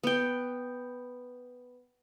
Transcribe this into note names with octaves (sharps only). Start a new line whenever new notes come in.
B3 G5